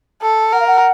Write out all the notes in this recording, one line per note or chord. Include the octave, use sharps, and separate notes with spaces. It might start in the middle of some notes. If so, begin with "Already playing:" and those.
A4
A#4 F#5
F5
F#5